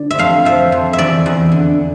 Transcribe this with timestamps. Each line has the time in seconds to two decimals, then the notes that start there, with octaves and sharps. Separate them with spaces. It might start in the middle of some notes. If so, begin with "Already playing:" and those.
Already playing: D3 D5
0.11 E5
0.19 F2 F5
0.45 F3 E5
0.72 F2
0.93 E5
0.99 E2 D5
1.26 E2
1.52 D3